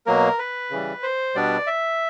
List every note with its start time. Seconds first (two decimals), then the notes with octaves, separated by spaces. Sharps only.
0.06 B2 F#3 A#3 A#4
0.39 B4
0.71 C#3 E3 G3
1.03 C5
1.35 B2 G3 B3 D4 D5
1.67 E5